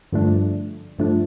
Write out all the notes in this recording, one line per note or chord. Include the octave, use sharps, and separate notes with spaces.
G2 D3 F3 A3 D4
G2 D3 F3 A3 D4